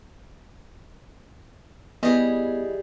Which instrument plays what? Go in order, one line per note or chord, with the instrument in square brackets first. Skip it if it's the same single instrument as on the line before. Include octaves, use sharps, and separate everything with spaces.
[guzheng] G3 G#4 [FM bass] B3 [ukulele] E4 D#5